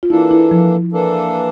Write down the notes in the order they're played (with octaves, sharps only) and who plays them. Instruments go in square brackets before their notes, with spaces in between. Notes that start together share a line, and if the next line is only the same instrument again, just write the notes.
[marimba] F4
[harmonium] E3 A#3 D4 A4 [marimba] E4
[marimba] E4
F3
[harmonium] E3 A#3 D4 A4